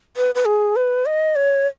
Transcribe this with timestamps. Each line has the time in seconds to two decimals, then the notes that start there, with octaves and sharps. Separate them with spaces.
0.17 B4
0.35 B4
0.46 G#4
0.76 B4
1.06 D#5
1.36 C#5